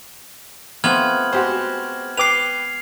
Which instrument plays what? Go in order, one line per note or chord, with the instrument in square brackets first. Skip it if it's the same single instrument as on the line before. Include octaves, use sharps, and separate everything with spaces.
[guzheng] F3 A3 C4 [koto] B3 [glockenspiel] F6 G#6 F#7
[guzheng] G#3 [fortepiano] F#4 G4 C5
[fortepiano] B4 G5 D6 [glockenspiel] C7 F7